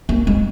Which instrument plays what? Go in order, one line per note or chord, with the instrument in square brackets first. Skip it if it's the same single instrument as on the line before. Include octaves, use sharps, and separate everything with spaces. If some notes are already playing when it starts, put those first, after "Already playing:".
[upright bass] A#3
G#3